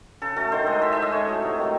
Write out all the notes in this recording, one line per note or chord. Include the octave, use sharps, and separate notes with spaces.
C#3 A4
F#3 A3 A4
D#3 C5
G#3 D#5
A2 E5
G#3 E5
D#5
A2 C#5
F#3 A3
C3
D#3 F#3 A3